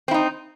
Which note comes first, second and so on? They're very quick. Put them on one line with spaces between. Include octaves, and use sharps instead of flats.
C4 E4 D#4